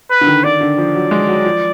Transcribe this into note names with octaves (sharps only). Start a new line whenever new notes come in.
B4
D3
D#3
D3 D5
D3
F3
F#3
G#3
F#3
F3